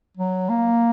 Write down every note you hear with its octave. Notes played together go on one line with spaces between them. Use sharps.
F#3
A#3